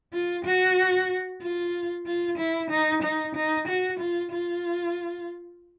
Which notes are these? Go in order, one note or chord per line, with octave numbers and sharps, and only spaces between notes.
F4
F#4
F4
F4
E4
D#4
D#4
D#4
F#4
F4
F4